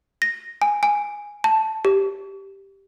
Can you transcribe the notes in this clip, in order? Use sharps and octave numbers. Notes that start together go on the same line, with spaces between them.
A#6
G#5
G#5
A5
G4